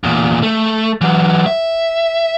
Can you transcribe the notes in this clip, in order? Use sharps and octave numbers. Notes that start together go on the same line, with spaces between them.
E2 A#2
A3
E3 F#3
E5